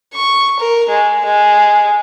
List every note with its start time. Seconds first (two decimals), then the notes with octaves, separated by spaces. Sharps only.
0.14 C#6
0.60 A#4
0.89 G#3
1.25 G#3